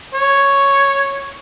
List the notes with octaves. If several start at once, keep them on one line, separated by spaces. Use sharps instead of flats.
C#5